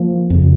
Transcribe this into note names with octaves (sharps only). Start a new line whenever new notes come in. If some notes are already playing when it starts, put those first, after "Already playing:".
Already playing: F3 A#3
F2 C#3